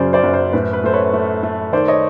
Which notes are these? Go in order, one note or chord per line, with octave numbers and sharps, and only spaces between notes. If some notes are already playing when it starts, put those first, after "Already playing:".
Already playing: F#2 C#3 F#3 C5 D5 G#5
C5 D5
F#2
C5
A2 B4
B4
A3 C5
B4 C#5
A3
A3
D#3 C5 D5
C#5 D#5